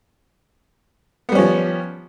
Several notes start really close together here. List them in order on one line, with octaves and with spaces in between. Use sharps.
B3 G3 C#4 F3